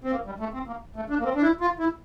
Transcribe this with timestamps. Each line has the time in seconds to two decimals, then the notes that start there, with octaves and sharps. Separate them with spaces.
0.04 C4
0.12 A#3
0.26 G3
0.40 A3
0.54 C4
0.67 A#3
0.96 A3
1.10 D4
1.19 A#3
1.24 C4
1.35 D4
1.42 E4
1.61 F4
1.80 E4